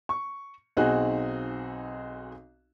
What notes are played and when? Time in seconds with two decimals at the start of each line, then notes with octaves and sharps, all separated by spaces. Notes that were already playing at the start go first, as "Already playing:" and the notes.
0.09 C#6
0.77 B1 C4 D#4 F#4 G#4 F#6